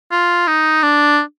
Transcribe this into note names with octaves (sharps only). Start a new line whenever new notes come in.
F4
D#4
D4